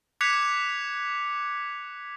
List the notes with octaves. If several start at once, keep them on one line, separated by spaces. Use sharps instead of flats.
D6 F#6 G#6 B6 C#7 F7